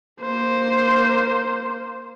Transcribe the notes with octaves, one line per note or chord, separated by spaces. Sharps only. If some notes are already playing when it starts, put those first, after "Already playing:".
A#3 C5